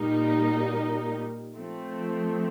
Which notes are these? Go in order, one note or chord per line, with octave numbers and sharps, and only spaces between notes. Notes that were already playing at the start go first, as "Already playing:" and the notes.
Already playing: A#2 G3 A#3 D#4
F3 A3 C4